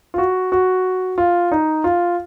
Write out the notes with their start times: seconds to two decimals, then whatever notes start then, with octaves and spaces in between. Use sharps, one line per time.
0.14 F4
0.18 F#4
0.52 F#4
1.18 F4
1.52 D#4
1.84 F4